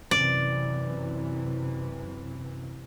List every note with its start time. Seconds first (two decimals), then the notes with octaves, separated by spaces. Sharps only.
0.11 F#2 C3 E3 D5